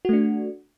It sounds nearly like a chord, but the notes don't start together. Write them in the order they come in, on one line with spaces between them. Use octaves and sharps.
F#4 A3 D4